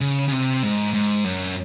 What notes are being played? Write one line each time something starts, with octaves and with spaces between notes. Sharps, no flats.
C#3
C#3
C3
G#2
G#2
F#2